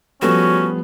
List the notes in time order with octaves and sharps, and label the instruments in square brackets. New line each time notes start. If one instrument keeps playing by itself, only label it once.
[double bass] F3 [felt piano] G3 A3 B3 [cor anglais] C#4 [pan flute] F#4